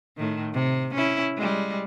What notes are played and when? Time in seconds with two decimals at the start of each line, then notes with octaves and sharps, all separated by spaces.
0.17 A2 D#3
0.53 C3
0.94 C#4 E4
1.37 G3 G#3